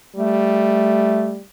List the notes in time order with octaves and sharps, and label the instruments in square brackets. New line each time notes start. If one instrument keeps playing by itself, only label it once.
[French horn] G3 [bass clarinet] A3